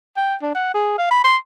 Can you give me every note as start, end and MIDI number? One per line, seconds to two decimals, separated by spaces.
0.17 0.35 79
0.42 0.50 62
0.55 0.73 78
0.74 0.98 68
0.98 1.06 77
1.11 1.22 83
1.25 1.37 84